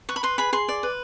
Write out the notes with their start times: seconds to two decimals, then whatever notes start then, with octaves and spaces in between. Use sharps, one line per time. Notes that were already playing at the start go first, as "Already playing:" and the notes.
0.09 B4 C#6
0.16 B5
0.23 B4 C6
0.38 G#4 B5
0.53 G#4 C6
0.68 D5
0.83 B4